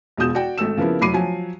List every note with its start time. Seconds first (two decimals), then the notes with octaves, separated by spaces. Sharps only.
0.17 E1 B2 F4 D#6 G6 E7
0.35 F#4 D5 G5
0.58 G#1 A3 E6 E7
0.77 C#3 F3 A#3 B3 E4
1.01 F1 F#3 B5 D6 C7 D#7
1.14 F3 F#3 G#5